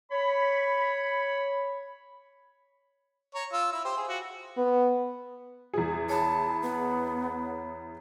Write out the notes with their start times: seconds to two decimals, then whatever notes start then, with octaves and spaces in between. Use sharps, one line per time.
0.12 C#5 B5
3.35 C#5 A#5
3.53 F4 E6
3.73 E4 E6
3.85 G4 C5
3.97 G#4
4.09 F4 F#4
4.57 B3
5.74 E2 G#4
6.09 C#5 A5 B5
6.62 B3